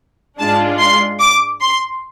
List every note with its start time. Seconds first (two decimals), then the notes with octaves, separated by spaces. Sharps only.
0.39 G#2 G#3 D4 F4 A5
0.80 C6
1.20 D6
1.60 C6